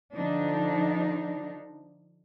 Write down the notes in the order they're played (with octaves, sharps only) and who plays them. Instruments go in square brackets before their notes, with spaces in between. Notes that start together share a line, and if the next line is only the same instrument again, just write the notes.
[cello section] D3 F3 D4 D#4